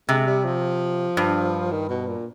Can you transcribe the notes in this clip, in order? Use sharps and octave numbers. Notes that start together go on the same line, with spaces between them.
C3 G#3
G3
F3
G2
D#3
B2
A#2